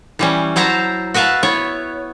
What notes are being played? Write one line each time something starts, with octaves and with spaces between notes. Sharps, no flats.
E3 G3 C#4
F#3 E4 C5 A5 A#5
F#4 B4 E5 F5 A5
B3 E4 C#5